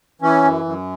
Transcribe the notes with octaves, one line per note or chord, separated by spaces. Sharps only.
E3 C#4
F#2
F#2